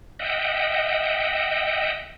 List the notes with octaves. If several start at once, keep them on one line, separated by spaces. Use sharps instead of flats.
D#5 E5 F#5 G5